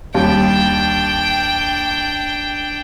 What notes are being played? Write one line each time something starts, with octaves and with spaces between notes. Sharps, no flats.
D#2 G3 D4 G5